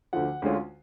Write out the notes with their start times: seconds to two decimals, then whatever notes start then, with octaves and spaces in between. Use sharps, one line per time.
0.13 D2 D3 F3 F#5
0.42 D2 D3 G#3 C#4 F4